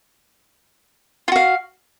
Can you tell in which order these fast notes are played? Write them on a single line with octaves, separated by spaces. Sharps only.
F4 F#4 F5